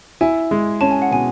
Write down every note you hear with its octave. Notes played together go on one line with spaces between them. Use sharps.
E4 G#5
G#3
C#4 A5
G#5
F#5
B2 G#5